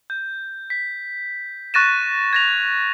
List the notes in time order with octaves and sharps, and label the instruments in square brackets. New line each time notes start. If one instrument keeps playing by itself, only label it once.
[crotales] G6
B6
C#6 F#6 A6 A#6 D#7 E7
G#6 A#6 F7